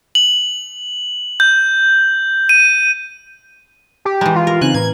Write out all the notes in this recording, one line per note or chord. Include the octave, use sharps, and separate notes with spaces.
F#7
G6
D#7
G4
E3 G#3 A#5
F4
A#4
C#3 C4 D#4 G#5 F#6
A2 B4 A#5 G#6